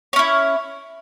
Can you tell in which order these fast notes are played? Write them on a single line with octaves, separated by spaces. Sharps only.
C#5 C#4 E4